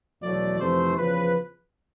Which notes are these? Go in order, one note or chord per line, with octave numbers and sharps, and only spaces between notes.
E2 B2 F#3 A3 D5
F2 C3 E3 A3 C5
E2 C#3 F3 B4